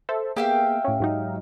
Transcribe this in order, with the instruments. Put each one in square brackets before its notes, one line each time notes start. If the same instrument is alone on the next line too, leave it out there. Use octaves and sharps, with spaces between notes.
[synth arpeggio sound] A4 C5 E5
[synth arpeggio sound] A#3 B3 G#4 [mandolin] G4 E5 F5
[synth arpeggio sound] A2 C#4
G#2 F#3 D#4